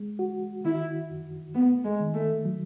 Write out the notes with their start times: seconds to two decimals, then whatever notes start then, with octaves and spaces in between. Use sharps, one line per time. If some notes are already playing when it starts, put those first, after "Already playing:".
Already playing: G#3
0.19 F#4
0.65 D#3 E4
1.10 F#2
1.55 A3 B3
1.84 G#3
2.00 D#3
2.14 A3
2.45 F#3